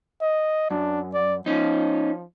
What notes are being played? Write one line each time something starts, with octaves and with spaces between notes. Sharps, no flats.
D#5
F#2 D4
D5
F3 C#4 D#4